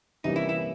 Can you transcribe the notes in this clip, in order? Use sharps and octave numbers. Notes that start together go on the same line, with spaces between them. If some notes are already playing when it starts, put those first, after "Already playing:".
C3 E3 G3 A#3 C#4 D#4
E4
E4